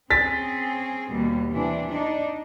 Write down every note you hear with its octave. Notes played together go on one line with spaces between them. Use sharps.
C4 C#4 G#4 A6 B6
D#2 B2 G3
C3 E3 D4
D4 D#4